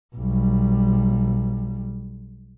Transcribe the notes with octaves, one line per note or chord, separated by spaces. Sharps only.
B1 G3